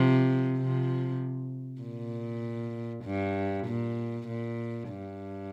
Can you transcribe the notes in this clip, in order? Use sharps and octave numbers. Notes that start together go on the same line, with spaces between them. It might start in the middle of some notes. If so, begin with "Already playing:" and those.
Already playing: C3 F3
C3 F3
A#2
G2
A#2
A#2
G2